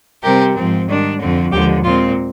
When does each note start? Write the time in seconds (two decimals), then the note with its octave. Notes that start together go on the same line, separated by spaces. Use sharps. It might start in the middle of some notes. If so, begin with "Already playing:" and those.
0.23 C3 G3 C4 G4 A#4
0.55 G#2 F3 C4
0.88 G#2 D#3 G3 D4
1.20 F2 D3 F3 C4
1.52 D#2 D3 F3 G#3 G4
1.84 A#2 G#3 C4 F4